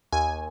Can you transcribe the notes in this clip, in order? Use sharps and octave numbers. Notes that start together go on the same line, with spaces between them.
D#2 G#5